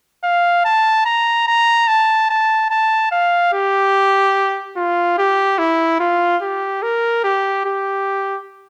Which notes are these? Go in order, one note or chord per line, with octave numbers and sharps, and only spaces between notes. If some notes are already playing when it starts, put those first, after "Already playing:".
F5
A5
A#5
A#5
A5
A5
A5
F5
G4
F4
G4
E4
F4
G4
A#4
G4
G4